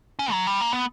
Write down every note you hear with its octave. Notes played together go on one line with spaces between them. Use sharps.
C#4
F#3
G3
A#3
B3